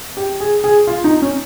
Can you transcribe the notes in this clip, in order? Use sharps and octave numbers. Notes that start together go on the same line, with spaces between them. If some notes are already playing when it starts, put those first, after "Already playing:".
G4
G#4
G#4
F4
D#4
C#4